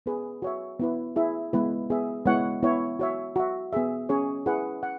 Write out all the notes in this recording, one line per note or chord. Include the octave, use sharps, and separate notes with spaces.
B3 G#4 B4
F#4 C#5 E5
B3 E4 B4
E4 G#4 E5
G#3 B3 E4 B4
B3 G#4 E5
G#3 B3 E4 C#5 F#5
B3 E4 C#5
F#4 C#5 E5
F#4 E5
B3 G#4 E5
C#4 G#4 C#5
E4 G#4 B4 F#5
F#5